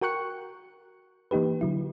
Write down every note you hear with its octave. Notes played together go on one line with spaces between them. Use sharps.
F#4 A#4 G5 C#6 F#6 C#7
E3 A#3 D#4 G4 B4
D3 F#3 E4